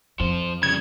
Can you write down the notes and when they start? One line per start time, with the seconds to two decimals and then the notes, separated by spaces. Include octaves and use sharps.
0.20 F2 F3 C5
0.63 C#3 G3 G#6